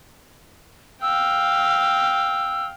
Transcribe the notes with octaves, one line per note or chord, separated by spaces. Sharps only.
F5 G5 E6